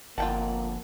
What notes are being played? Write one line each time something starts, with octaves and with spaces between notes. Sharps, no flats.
G1 F2 A#2 A#3 F4 F#5 G5 A5